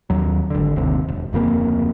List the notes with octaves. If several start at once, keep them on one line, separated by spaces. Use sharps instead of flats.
D#2 F#3
G#1 D3
D1 G#1 D#2 C3
E1
D1 F2 C#3 A#3